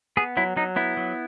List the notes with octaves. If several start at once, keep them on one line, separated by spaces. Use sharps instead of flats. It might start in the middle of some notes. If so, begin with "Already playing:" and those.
B3 G#4
F#3 E4
F#3 D#4
B3 E4
F#3